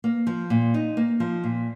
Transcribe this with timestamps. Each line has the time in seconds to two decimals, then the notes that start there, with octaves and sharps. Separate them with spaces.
0.04 A#3
0.27 F3
0.50 A#2
0.74 D#4
0.97 A#3
1.20 F3
1.44 A#2